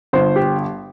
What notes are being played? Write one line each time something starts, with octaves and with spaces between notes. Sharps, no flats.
G1 C5
G4